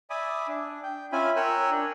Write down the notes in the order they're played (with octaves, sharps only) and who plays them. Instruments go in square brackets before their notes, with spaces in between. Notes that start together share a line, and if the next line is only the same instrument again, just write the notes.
[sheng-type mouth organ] D5 E5 G#5 B5 D6 D#6
D4
G5
C#4 F4 E5 G#5 B5
A#4 C#5 G5 G#5 E6 F#6
D4